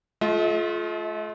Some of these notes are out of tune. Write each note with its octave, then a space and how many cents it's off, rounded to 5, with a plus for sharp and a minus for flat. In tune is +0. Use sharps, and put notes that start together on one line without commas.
A3 -40 F4 +0 D#5 +40